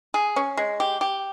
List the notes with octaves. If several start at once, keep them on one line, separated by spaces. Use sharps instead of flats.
G#4
C#4
G#3
G4
G4